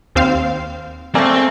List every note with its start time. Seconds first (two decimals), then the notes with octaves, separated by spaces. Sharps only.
0.15 D#2 C4 F5
1.15 A3 A#3 C4 A4 D5 G#5